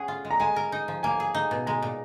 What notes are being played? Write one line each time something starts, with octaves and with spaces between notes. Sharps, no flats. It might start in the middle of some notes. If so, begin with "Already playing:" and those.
Already playing: C#4 G#4 F#5
F4
G#3
A#5
G#3 G#5
A#4
D#4
F3
A#3 G#5
G#4
D#4
B2
G#3 A#5
A#2